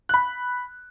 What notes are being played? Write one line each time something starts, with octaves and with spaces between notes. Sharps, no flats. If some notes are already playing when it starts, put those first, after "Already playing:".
B5 F#6